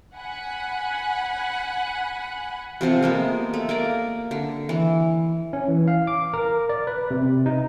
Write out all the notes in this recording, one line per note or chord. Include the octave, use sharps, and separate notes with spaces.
F#5 G#5 B5
C3 F3 C4 A4
G#3 A#3 B3
A3
A#3 A#4 D5
D3
E3
C#4
E3
F5
D6
A#4
D5
B4
C3
D#4